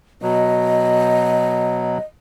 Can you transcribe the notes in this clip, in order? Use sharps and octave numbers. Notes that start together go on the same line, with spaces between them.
B2 F#3 D#5